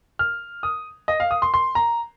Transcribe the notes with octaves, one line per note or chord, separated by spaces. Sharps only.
F6
D#6
D#5
F5
D#6
C6
C6
A#5